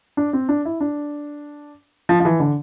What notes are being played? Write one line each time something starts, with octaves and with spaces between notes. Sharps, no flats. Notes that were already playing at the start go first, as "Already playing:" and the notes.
D4
C4
D4
E4
D4
F3
F3
E3
D3